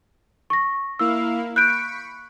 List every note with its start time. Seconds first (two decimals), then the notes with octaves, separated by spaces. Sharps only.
0.50 C#6 A#6
0.99 A#3 E4 F5 E6
1.56 B5 C#6 F#6 G6 D7